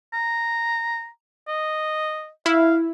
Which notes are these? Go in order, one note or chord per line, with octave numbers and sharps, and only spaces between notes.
A#5
D#5
E4 F5